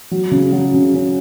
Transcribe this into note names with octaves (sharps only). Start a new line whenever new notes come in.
F#3
C#3
F#3
C#3
C#4